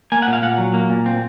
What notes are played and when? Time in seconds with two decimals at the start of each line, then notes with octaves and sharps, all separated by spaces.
0.12 A#3 G#5
0.22 F#5
0.28 A#2
0.33 F5
0.42 A#2 F#5
0.58 F#3
0.74 A#3
0.90 A#2
1.06 C4